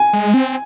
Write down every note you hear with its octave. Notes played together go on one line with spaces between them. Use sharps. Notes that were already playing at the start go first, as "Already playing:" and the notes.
Already playing: G#5
G#3
C4